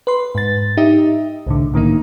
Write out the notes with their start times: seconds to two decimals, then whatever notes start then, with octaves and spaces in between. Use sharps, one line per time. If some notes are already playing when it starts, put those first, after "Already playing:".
0.07 B4 C6
0.35 G#2 A6
0.77 D#4 G4 D#5 E5
1.47 C2 A2 D3
1.74 A2 D#3 A#3 D#4